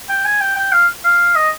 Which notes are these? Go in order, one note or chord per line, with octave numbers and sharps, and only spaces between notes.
G5
G#5
G5
G5
F5
F5
D#5